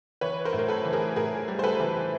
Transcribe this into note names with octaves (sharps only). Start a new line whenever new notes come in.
E3 B4 C#5
A#4 C5
A2
A#4
A4 B4
E3
G#4 A#4
A2 G#4 A#4
G3
C5
A4 B4
E3